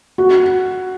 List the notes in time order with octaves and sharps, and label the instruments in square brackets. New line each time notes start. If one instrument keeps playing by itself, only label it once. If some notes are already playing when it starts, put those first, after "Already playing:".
[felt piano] F#4